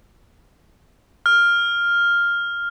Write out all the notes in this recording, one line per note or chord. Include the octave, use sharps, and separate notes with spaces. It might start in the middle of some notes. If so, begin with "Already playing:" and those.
F6